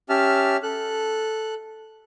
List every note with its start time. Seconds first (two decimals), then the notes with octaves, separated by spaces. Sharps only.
0.09 C#4 G4 E5 A5 F6
0.63 A4 F#6